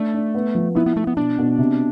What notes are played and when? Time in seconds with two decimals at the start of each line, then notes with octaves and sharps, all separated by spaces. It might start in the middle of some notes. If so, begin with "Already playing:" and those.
Already playing: A3 D4
0.14 D4
0.35 B3
0.55 F3
0.75 B3 E4
0.86 B3
0.96 A3 E4
1.07 B3
1.17 B2 D4
1.38 B2
1.58 C3